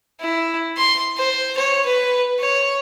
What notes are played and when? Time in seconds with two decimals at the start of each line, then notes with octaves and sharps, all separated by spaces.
0.20 E4
0.77 C6
1.17 C5
1.57 C#5
1.86 B4
2.39 C#5